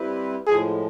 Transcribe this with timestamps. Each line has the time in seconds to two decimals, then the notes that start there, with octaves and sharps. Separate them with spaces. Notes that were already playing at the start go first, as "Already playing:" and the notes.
Already playing: G3 C4 E4 G4 B4
0.47 A2 F3 G#3 G#4